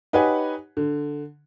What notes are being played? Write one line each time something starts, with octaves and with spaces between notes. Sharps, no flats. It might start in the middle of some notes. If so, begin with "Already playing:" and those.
D#4 G4 B4 C#5 F#5 G#5
D3